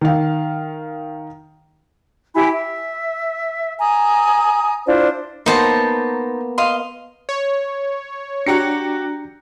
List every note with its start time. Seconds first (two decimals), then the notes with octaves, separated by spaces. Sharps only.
0.01 D#3 F5
2.35 E4 G4 G#5 B5
2.54 E5
3.79 G#5 A#5 D#6
4.86 D4 E4 F4 C5
5.46 A#3 B3 D#4 C5 A5
6.58 D#5 F5 C6
7.29 C#5
8.46 D4 F#4 G4 A#5 C#7